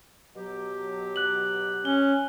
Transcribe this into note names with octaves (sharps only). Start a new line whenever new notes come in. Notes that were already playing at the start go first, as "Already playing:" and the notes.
B2 F#3 G4
F#6 F#7
C#4 G7